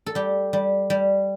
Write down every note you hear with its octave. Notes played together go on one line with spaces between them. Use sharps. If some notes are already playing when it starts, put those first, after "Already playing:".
A4
G3 G4
G3
G3